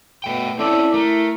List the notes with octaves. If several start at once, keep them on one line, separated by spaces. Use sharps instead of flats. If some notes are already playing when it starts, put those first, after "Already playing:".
B2 A3 G5
C4 C#4 E4 A4 D5 E5
A3 A#4